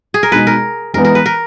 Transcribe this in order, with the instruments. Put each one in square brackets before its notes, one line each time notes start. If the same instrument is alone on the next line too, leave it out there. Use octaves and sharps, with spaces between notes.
[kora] G#4
A#4
[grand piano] B2 G#3 D#4 [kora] B4
[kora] A#4
[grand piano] E3 G#3 B3 [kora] A#4
[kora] A#4
B4
A#4